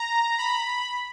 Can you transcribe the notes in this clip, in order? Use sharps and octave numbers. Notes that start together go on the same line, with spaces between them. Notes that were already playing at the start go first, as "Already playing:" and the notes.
Already playing: A#5
B5